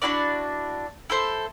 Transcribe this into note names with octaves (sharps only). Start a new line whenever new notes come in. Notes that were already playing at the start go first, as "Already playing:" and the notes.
D4 E4 F#4 D5
E4 A4 C5